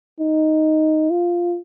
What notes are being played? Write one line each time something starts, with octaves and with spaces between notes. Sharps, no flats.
D#4
F4